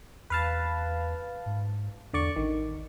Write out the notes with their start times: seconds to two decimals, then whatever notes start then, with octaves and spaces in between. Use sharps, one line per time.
0.30 E2 B4 F5 A5
1.46 G#2
2.14 E2 D3 D5 C#6
2.36 A1 D#3